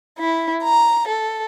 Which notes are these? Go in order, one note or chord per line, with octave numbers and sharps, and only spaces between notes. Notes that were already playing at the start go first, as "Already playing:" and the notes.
E4
A#5
A4